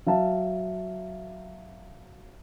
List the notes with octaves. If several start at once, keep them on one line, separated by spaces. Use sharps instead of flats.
F#3 E5 F5 A5